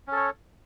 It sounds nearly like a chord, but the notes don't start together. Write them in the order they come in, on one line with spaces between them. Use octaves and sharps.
C#4 A4 C#5